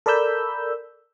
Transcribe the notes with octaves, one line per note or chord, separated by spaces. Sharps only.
A4 A#4 D5 B5 E6 G6